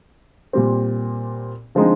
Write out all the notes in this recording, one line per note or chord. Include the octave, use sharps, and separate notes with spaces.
A#2 G3 C4
D3 F3 G#3 C4 D#4